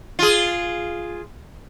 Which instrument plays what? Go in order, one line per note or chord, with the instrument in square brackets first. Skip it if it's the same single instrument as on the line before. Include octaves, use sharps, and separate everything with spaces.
[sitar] F4 G#4